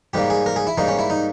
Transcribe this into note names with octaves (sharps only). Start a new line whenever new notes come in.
G#2 G3 A#3 G4
G#4
A#4
G#4
E4
G#2 G3 A#3 D#4
C#4
E4
D#4